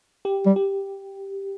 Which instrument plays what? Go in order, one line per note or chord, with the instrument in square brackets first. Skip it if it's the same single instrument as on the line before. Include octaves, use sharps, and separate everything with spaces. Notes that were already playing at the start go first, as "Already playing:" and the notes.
[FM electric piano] G4
[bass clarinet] G3
[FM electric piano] G4